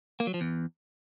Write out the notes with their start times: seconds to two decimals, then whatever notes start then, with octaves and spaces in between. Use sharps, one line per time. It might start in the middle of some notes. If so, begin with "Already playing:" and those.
0.20 A#3
0.27 F#3
0.34 F3
0.41 E2